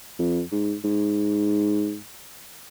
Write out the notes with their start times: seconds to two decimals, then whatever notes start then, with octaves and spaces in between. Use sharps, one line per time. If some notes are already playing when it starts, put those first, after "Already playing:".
0.19 F2
0.52 G#2
0.84 G#2